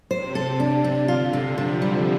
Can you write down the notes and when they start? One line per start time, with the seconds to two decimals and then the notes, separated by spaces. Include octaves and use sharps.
0.10 C3 C5
0.35 A4
0.60 D4
0.84 D4
1.08 D3 F4
1.33 C3
1.57 C3 F3
1.82 G3